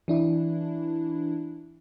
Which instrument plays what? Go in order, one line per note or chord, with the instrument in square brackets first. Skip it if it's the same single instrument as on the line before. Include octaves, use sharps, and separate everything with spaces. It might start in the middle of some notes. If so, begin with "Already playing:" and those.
[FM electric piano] E3 D4 E4